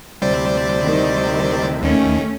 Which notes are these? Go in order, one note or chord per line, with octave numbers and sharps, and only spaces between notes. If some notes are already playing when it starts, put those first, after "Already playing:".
D2 C3 G3 E4 C5 D5
D#3
D#2 D#3 A3 C#4